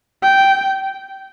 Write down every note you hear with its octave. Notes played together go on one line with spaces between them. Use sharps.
G5